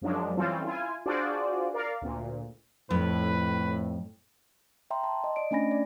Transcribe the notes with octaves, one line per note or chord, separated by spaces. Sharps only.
F#2 F3 F#3 G#3 D4
E3 G3 C4 C#4 F4 A4
E4 F4 G#5
D4 F4 F#4 G#4 C5 D5
A#4 D5 F5
D2 A#2
F2 A2 B4
E5 G5 A#5 C6
A5 C6
D#5
D5 D#5 D7
A3 C#4 D4 G#5 B5 A#6
D5